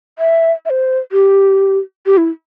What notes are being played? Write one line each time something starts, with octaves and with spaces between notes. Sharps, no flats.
E5
E5
C5
G4
G4
E4